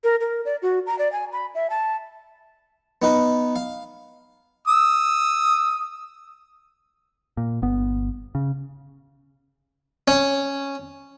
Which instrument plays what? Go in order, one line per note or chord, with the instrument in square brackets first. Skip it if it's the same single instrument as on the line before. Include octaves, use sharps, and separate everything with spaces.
[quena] A#4
A#4
D5
F#4
A#5
D5
G#5
B5
E5
A5
[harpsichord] B3 D#4 B4
F5
[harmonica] D#6 E6
[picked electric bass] A#2
G1 B3
C#3
[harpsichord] C#4